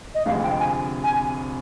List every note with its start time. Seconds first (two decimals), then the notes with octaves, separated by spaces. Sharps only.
0.15 D#5
0.25 F1 F2 D3 G#3 F5
0.38 G#5
0.43 G5
0.60 G#5
1.04 G#5